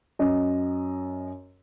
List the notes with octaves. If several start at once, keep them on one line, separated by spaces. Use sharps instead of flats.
F#2 D#5